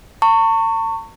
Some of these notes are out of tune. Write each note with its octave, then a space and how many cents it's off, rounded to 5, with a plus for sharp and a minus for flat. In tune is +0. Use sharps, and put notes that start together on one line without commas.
A5 +45 C#6 +0